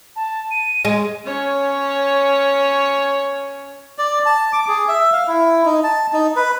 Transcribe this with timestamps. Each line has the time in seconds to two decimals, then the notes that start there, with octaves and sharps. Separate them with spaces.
0.16 A5
0.51 D#7
0.85 G#3
1.25 C#4 C#5
3.98 D5
4.26 A5
4.53 D6
4.68 G#4
4.88 E5
5.12 F5
5.27 E4
5.66 D#4
5.84 A5
6.13 D#4
6.36 B4